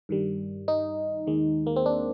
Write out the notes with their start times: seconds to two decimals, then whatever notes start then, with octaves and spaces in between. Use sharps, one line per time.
0.09 G2 D#3 G3
0.68 D#4
1.27 D#2 D#3 G#3
1.67 A#3
1.76 C4
1.86 D4